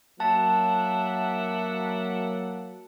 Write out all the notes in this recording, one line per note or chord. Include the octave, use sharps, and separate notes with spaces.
F#3 A#3 D4 E5 F#5 A5